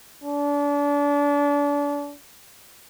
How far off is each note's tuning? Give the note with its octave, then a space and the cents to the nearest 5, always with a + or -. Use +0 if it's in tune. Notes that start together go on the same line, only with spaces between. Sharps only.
D4 -35